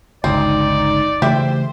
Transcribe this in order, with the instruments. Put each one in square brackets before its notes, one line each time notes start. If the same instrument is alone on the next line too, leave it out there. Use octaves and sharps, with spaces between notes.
[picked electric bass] G1 C#2 [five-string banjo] C4 [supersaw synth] D#4 [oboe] D5
[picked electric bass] C#3 E3 A3 [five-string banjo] G4 E5 [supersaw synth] C5